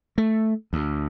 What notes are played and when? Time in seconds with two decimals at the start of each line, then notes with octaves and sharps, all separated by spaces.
0.18 A3
0.73 D2